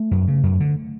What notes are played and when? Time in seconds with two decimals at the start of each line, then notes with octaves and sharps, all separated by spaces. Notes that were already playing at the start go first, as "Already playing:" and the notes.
Already playing: A3
0.11 F#2
0.28 C#3
0.43 F#2
0.60 D3